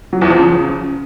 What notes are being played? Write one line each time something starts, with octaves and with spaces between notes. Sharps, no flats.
F#3
E2
F3
C#3